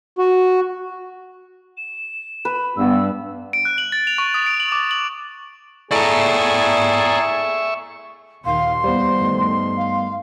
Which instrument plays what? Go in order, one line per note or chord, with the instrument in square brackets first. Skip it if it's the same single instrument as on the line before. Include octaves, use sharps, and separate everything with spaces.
[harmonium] F#4
[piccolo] E7
[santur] B4
[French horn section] G2 [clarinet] B3 [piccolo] E6
[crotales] D7
F#6
F#7
A6
F7
C#6
D#6
D7
F#7
D6
F#7
[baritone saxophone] A2 [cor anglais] G#4 [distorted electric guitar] D5 A#5 [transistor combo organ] E5 C#6
[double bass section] D#2 A#2 D#3 [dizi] F5 [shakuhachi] C6
[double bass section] E2 E3 [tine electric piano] G3 B3 [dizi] C5
[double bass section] G2 D#3 A3
[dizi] F5